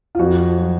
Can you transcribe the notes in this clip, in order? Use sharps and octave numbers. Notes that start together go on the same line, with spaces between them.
F4
F2 F#4
F#3